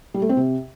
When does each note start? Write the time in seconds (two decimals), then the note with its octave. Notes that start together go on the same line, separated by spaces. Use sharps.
0.14 G3
0.22 A3
0.29 C4
0.37 C3